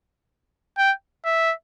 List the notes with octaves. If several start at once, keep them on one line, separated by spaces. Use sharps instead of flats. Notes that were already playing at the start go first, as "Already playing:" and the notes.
G5
E5